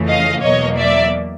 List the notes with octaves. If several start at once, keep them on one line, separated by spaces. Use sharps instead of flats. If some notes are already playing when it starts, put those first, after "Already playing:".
Already playing: F2 C#3 E3 A3
D#5 F5
E2 B2 F#3 A#3 C#5 D#5
D5 E5